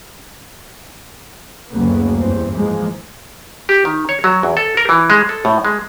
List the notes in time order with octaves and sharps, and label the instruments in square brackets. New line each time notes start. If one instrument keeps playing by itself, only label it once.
[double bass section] F#1 D2 C#3 F#3 A#3 B3
F#1 E2 G2 E3 C4
G#2 E3 F3 G#3 A#3
[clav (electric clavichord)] G4
D#3
C#5
F#3
E2
A4
A#4
E3
G#3
A4
A2
G#3